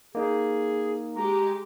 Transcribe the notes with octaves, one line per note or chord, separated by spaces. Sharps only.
A#3 D#4 G#4
G#3 G4 A#5